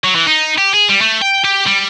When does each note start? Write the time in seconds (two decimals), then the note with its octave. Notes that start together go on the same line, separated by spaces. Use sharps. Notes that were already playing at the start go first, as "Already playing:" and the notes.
0.04 F#3
0.15 E3
0.27 D#4
0.58 G4
0.74 G#4
0.89 G3
1.01 A3
1.22 G5
1.45 G4
1.67 G3